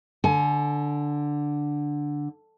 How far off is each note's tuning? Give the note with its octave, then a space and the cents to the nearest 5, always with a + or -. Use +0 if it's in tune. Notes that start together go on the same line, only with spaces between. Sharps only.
D3 +0 G#5 +30